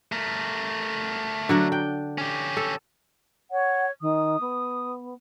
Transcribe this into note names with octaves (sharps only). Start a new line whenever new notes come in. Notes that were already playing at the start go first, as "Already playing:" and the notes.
A3 A#4
D3 F#3 D4
G5
C#4 G4
A4
C#5 F#5
D#3 D#6
B3